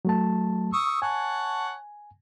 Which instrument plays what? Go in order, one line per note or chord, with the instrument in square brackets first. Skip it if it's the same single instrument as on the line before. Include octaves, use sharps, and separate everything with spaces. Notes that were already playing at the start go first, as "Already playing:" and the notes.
[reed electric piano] F#3 A3 A5
[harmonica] C#6 D#6 E6
[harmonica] C#5 F#5 A5 [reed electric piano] G#5